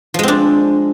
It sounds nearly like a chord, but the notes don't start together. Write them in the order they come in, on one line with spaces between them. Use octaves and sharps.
F3 G#3 C4 D4